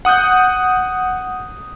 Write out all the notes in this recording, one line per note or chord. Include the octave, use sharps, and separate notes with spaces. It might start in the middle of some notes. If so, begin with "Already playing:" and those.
F#5 D#6 F#6 G6